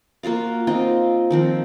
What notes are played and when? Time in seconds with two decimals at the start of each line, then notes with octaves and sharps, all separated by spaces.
0.23 A#3 F4 F#4 F5
0.67 C4 D#4 F4 D#5
1.31 D#3 F3 C4